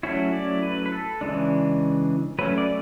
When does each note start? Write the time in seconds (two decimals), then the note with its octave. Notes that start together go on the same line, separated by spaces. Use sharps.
0.03 F#3 A3 C#4 E4 F#4
0.33 D5
0.63 B4
0.86 B4
0.92 A4
1.21 C#3 E3 G#3 D4
2.39 F#3 A3 C#4 B4
2.58 D5